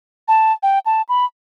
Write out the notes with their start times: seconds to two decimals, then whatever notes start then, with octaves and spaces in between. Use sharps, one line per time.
0.28 A5
0.63 G5
0.86 A5
1.09 B5